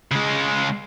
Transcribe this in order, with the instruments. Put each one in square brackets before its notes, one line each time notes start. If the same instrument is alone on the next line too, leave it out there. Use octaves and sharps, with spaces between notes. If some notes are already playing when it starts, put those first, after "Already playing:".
[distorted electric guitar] C#3 G#3